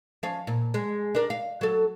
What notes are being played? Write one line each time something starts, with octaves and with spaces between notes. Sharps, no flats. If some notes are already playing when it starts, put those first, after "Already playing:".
F3 C#4 F5
A#2
G#3
D4 A#4
F5
F#3 A4